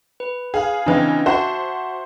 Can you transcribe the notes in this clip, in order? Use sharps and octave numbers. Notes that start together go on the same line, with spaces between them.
B4
G#4 F5
C#3 E3 C4 D4 E4 D#5
F#4 C5 E5 F#5 A5